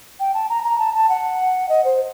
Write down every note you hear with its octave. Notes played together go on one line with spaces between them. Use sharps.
G5
A5
A#5
A#5
A5
A5
F#5
D#5
C5